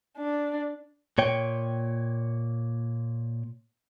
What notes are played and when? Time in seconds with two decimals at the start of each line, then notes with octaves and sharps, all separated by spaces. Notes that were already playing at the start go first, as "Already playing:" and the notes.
0.18 D4
1.18 A#2 C#5 G5